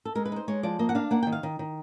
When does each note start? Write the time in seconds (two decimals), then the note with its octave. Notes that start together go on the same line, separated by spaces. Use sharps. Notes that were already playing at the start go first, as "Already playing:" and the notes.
0.05 A4
0.15 G#3 A#4
0.25 B4
0.32 D#4 C5
0.48 G#3 C#5
0.63 F3 D5
0.79 A#3 D#5
0.89 F#5
0.95 D4 F5
1.11 A#3 F#5
1.23 D#3 G5
1.32 F5
1.43 D#3
1.59 D#3